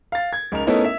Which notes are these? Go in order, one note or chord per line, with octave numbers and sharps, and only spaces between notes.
F5 A6
G#6
C#2 D#4 A#4 F7
A3 B3 C#4 D#4 E4 A#4
E5